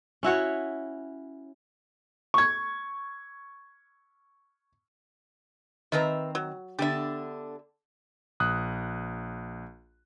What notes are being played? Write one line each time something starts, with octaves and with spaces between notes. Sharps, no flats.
C#4 E4 F#4 C#5
C#6 G#6
D#3 C4 B4 D#5 E5 A#5
F#3
D3 B3 D4 G4 E5
A#1 D#6 F#6